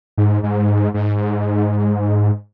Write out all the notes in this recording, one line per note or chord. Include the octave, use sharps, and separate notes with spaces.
G#2
G#2
G#2